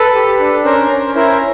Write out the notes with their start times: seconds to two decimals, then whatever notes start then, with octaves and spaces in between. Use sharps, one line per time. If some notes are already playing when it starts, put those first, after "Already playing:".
Already playing: A4 B4
0.15 G4
0.40 D4
0.65 C#4 A#4 C5
0.90 C#4
1.15 E4 A#4 C5